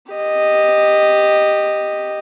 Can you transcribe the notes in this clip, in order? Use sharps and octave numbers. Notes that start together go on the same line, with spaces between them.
G4 D#5